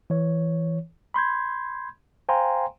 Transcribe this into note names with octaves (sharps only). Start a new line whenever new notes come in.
E3 C#5
B5 C6 G6 G#6
C5 F5 G5 G#5 A#5 C6